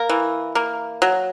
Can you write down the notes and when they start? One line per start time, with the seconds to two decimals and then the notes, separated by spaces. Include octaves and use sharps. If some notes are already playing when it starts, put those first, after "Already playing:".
Already playing: A#3 A#4
0.09 E3
0.55 A#3
1.02 F#3